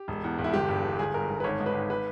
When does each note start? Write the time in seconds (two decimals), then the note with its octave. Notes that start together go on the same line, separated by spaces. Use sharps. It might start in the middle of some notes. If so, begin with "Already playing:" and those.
Already playing: G4
0.08 E1
0.24 E2
0.38 E1
0.44 E4
0.53 G1 G4
0.69 G2
0.84 G1
0.99 G1 G#4
1.14 G2 A#4
1.29 G1
1.40 B4
1.44 G#1 C#5
1.60 G#2
1.66 B4
1.74 G#1
1.90 B4